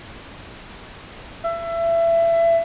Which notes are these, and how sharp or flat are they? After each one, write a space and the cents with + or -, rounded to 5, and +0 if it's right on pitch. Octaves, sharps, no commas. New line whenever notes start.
E5 +25